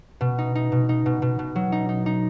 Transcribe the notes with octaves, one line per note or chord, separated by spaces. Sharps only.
B2
D#4
D#4
B2
D#4
B2
B2
B2
F#3
D#4
D#4
D#4